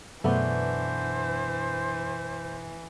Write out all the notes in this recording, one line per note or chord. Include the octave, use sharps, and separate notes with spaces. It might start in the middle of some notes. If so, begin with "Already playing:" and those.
F#2 B2 E3 A3 B3 D4 C5